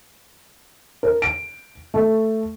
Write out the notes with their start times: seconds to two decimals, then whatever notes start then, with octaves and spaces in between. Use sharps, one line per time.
1.03 A#4
1.22 D7
1.94 A3